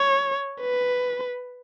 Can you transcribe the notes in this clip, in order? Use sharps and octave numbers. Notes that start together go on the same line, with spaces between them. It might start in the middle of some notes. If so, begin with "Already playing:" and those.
Already playing: C#5
B4